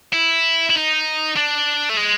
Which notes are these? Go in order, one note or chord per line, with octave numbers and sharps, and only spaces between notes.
E4
E4
D#4
D4
A3
G#3